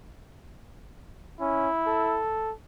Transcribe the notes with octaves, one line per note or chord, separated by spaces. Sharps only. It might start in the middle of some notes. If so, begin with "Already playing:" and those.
C#4 E4
A4